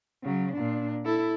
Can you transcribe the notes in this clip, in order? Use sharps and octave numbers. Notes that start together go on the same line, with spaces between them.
C#3 F#3
A#2 D4
E4 A4